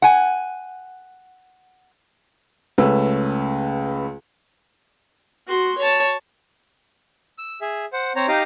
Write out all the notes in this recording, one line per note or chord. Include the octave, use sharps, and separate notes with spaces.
F#5 G#5
C#2 A3 C#4 B4 E6
F#4 C6
C#5 A5
E6
G#4 E5
C5 F#5
C4 C5 C#5 A#5
D#4 G4 D#5 F5 A#5 D6